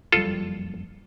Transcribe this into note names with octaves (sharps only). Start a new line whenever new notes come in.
F#1 F2 G3 F4 A4